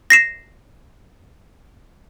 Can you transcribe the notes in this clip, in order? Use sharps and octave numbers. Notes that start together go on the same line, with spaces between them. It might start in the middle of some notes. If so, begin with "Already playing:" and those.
A#6 C7 E7